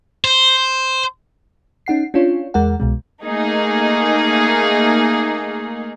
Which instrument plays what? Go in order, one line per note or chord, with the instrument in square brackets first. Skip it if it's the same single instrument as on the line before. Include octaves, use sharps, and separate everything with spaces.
[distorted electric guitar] C5
[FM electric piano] C#4 D#4 F#5 C7
C#4 D4 F4 C#5
E2 G#3 A#4 F#5
C2 B2 G#3
[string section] A3 A#3 D#4 G#4